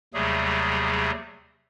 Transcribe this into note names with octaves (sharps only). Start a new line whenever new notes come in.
D#2 C3 F#3 G3 A3 G#4